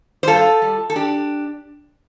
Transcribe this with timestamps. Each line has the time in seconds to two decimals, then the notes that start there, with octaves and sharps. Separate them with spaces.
0.23 C5
0.28 G2 F4 A4
0.62 G3
0.90 A4
0.96 D4 G4